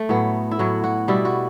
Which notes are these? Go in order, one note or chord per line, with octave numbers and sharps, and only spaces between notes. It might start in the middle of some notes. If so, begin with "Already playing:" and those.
Already playing: A3
A2 F#3 B3
E4
A2 F#3 F#4
F#4
B2 G3 E4
F#4